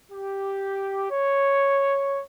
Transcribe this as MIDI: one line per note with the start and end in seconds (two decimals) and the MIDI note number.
0.11 1.10 67
1.11 2.22 73